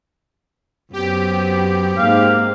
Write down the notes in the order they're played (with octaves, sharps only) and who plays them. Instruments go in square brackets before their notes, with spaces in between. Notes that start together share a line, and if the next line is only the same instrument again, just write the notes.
[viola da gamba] F#2 B3 C4 [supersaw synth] G4
[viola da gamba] G#2 C4 [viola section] A#3 [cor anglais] F5